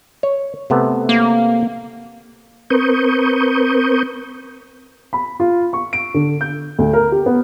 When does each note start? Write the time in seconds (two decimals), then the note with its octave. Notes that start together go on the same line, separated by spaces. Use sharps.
0.23 C#5
0.70 C3 A3 B3
1.09 A#3
2.70 C4 A#4 B4 C#6 D#6 G6
5.13 B5
5.40 F4
5.73 C#6
5.93 D7
6.14 D3
6.41 G6
6.78 D2
6.93 A#4
7.12 G4
7.26 B3